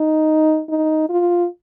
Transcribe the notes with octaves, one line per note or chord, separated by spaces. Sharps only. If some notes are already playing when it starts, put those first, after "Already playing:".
Already playing: D#4
D#4
F4